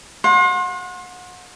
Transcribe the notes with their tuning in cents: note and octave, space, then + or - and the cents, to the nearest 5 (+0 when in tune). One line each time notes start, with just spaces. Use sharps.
F#5 -35 C6 +35